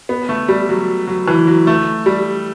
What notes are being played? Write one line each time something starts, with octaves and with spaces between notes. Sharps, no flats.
B3
A3
G3
F#3
F#3
E3
F#3
A3
G3